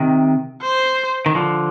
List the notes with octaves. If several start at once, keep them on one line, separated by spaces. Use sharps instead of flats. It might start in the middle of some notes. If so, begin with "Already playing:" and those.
Already playing: C3 D#3
C5
D#3
D3 F3